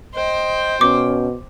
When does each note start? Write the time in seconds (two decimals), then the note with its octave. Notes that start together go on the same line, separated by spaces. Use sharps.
0.14 C5 D#5 G5
0.81 B2 C#4 D6